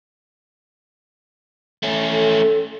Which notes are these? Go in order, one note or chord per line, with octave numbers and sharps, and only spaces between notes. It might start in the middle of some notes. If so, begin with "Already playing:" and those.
A3 C#4
A4